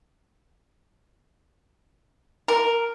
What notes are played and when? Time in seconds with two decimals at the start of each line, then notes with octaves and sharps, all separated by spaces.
2.48 A#4